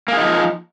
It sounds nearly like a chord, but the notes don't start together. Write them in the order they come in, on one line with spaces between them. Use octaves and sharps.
A#3 G#4 D#4 F3